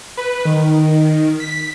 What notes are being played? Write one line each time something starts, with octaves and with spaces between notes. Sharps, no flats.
B4
D#3
B6